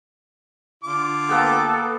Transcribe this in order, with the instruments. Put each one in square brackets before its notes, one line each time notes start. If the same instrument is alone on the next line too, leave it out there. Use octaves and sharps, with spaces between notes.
[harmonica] D3 F4 D6
[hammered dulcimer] A#3 B3 G4 [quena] A4